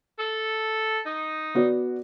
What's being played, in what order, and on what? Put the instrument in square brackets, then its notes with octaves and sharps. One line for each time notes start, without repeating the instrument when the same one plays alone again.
[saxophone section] A4
D#4
[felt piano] B3 F#4 D5